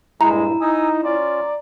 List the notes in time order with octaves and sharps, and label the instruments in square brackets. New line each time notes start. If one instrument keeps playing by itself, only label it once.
[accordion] G2 A#2 [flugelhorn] G#3 [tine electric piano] E4 [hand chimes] A#5
[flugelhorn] D#4 [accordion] G#5 D#6 E6
[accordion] C#4 F4 [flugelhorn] D5